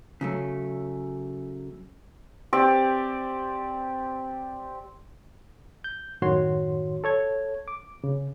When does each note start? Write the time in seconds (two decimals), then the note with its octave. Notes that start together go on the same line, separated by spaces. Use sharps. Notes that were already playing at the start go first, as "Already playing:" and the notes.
0.21 C#3 F#3 A3
2.53 C4 G4 D5
5.84 G6
6.22 F#2 A2 D#3 F#4 C#5 C6
7.04 A4 C#5 G#6
7.68 D6
8.04 C#3